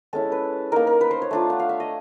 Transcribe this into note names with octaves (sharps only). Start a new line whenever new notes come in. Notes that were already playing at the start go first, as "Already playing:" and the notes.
G#3 C#4 E4 A4
B4
A#3 D#4 A#4
A#4
B4
C5
C#5
A3 D4 F4
F#5
F5
E5
D#5